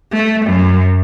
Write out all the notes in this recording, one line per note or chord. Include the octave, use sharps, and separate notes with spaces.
A3
F#2